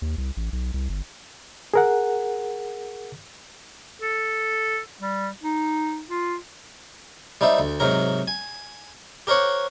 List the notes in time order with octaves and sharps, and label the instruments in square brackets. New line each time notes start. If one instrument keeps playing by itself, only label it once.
[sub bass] D#2
C2
A1
B1
C2
G1
[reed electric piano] G#4 A#4 F#5
[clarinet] A4
G3
D#4
F4
[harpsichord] G3 D#4 C5 E5
D2
G#2 C3 F#3 A#4
G#5
G4 A#4 C5 C#5 F#5